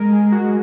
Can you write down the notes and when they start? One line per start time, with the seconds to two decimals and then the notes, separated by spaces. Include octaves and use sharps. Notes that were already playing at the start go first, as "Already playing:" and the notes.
Already playing: G#3 A#4
0.13 G#4
0.32 F#4